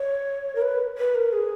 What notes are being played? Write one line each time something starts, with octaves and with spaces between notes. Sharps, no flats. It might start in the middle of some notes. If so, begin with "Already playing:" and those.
Already playing: C#5
A#4
B4
B4
A#4
G#4